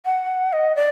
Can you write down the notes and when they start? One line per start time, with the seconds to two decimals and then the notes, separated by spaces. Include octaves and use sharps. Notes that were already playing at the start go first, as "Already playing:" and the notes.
0.05 F#5
0.53 D#5
0.76 D5